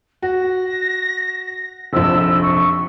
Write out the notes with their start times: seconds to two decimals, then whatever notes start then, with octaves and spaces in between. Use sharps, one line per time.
0.22 F#4 A#6
1.93 F1 A#1 E6
2.41 C#6